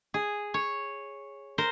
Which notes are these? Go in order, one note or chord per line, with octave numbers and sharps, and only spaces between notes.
G#4
C#5
A#4 C5